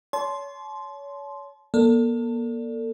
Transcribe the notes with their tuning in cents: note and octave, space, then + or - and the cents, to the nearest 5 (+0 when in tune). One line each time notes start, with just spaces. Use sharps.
C#5 +30 A5 -35 C6 +0
A#3 +40 A4 +35 D5 +0